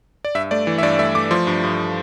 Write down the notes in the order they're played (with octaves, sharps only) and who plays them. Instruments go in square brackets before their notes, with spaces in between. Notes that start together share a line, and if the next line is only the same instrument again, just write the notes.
[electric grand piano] D5
G2 E5
A3 D5
E3
E5
G2 D5
A3 E5
A3 D6
F3 C6
G2
G2